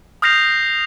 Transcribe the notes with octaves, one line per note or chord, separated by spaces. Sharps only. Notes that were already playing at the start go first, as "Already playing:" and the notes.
D#6 F6 G6 A#6 C7 F7